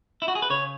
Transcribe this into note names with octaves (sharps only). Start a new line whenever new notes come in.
E4
F#4
G#4
B4
C#3 C#5